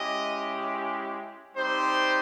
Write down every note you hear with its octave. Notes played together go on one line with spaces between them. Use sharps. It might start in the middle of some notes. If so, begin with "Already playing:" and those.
Already playing: G#3 C#4 E4 G4 D#5
G3 C4 D#4 G4 C5